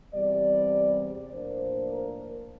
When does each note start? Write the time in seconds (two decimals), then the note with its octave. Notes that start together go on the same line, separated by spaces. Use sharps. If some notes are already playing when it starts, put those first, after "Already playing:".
0.13 E2 C3 G3 D5
1.02 D5
1.32 A2 F3 A#3 D4 C5
1.92 A#4